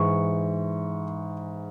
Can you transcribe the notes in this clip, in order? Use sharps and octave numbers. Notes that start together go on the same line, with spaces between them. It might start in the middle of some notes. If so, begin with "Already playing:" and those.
Already playing: G#2 E3 C#6